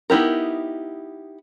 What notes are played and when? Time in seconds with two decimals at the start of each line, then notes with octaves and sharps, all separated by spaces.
0.10 B3 D#4 E4 G4 A#4